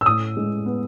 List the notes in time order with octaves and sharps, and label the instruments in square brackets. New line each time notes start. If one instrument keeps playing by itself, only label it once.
[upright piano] E6
A2 D#6
G#3
B3